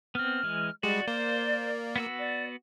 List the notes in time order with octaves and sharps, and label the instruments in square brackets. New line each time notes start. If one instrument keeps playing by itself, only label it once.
[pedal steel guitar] B3 C4 [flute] F6
[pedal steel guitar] E3 G#3
[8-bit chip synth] G3 G#3 [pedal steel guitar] F#4 [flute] D5
[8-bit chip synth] A#3 [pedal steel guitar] C5
[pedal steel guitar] B3 F#4 E6
[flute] D5